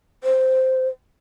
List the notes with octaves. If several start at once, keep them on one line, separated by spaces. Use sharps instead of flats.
C5